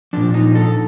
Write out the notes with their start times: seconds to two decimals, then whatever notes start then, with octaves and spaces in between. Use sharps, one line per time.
0.13 A#2 F3 D4
0.34 D#4
0.55 A4